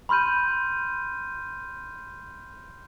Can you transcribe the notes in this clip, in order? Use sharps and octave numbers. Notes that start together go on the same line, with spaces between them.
B5 C6 F6 G6 D#7